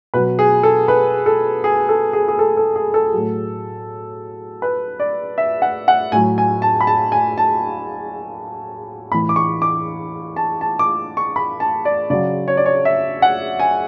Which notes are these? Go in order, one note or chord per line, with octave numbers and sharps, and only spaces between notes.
B2 F#3 B4
G#4
A4
B4
A4
G#4
A4
G#4
G#4
A4
A4
G#4
A4
A2 F#3
B4
D5
E5
F#5
F#5
A2 F#3 G#5
G#5
A5
B5
A5
G#5
A5
A2 E3 B5
D6
C#6
D6
A5
A5
D6
C#6
B5
A5
D5
C#3 F#3 D5
C#5
D5
C#5
E5
F#5
G#5